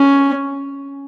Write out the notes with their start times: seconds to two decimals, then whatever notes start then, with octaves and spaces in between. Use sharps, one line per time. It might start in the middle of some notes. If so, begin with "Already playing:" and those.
Already playing: C#4